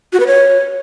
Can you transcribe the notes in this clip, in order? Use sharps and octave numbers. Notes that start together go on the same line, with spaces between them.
F#4
B4
C#5